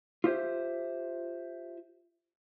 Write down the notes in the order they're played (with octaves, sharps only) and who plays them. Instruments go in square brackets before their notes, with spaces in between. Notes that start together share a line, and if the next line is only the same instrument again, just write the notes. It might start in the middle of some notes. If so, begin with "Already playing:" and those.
[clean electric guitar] F4 G4 C5 E5